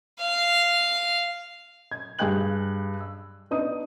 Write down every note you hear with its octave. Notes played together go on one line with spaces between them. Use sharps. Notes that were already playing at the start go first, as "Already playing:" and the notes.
F5
G#6
G2 G#4 F5 G5 F#6 F#7
E6
B3 D4 D#4 D#6